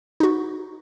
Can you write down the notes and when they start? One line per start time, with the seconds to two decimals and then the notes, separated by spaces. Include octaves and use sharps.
0.20 D#4 F#4